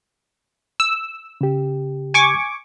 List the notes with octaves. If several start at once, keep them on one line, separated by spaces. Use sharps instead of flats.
E6
C#3 G4
G#5 C#6 D6